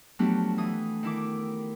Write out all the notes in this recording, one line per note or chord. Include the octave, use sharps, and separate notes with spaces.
F3 F#3 A3 B3 D4 G4
E3 D#6
D#3 E4 D6